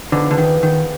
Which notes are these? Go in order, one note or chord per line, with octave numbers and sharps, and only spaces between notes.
D3 F3 B3 D#4 G#4
D3
D#3
D#3